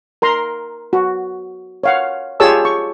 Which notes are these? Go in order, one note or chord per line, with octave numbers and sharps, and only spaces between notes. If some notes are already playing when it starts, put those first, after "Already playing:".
A#4 A#5 C6
F#4
C#5 F5 F#5
F4 G4 G#4 C#5 A5 E6
C#6